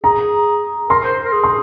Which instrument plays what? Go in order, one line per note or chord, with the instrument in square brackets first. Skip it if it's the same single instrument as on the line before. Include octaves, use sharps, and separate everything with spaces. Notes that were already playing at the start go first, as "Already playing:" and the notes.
[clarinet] G#4 [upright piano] A#5
[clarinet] A#4 [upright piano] C6
[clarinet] C5
A#4
G#4
[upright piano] C6